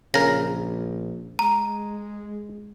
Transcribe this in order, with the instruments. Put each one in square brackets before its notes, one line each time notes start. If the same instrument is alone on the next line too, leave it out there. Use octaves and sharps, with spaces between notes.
[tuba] A#1 [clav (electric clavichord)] C#3 A#4 [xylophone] A#6
[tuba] G#3 [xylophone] A#5